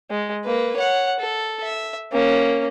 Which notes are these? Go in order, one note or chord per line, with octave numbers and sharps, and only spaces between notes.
G#3
A#3 B4
C#5 F#5
A4
E5
A#3 C#4